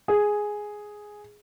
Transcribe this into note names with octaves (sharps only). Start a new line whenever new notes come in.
G#4